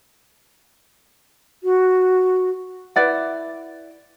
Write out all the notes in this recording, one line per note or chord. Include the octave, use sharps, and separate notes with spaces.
F#4
E4 B4 D5 F#5